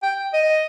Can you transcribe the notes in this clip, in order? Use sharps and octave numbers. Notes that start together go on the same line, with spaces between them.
G5
D#5